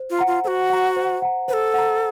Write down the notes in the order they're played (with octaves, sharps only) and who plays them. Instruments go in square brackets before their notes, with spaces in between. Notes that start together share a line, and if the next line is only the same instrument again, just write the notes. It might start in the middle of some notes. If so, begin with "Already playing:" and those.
Already playing: [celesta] C5
[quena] F4
[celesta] F#5 A#5
[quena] F4
[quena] F#4 A4 [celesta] C5
[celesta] F#5 A#5
C5
F#5 A#5
[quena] B4 [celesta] C5
[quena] A4
[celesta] F#5 A#5